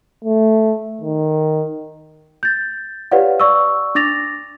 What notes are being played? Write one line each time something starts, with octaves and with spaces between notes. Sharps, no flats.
A3
D#3
G6 A6
G4 B4 C#5 D5 F5 F#5
D5 C#6 E6
D4 D6 A6 A#6 F7